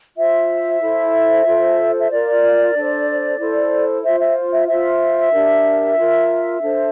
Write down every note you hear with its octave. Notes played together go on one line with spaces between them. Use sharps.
F4 C5 E5
E4 A4 C5
F4 A4 C5
E5
F4 A#4 D5
D4 A4 C5
E4 A4 C5
F4 C5 E5
E5
E5
F4 C5 E5
D4 G4 A#4
F4 A#4
D4 A4 C5